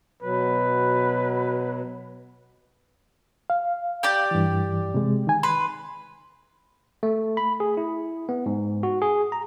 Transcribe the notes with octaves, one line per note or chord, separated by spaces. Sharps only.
B2 F#3 B4
F5
G4 D5 G5
G2 E3
C3 G#3
D#3 G#5
B4 C6
A3
B5
G#4
E4
B3
G#2
F#4
G#4
A#5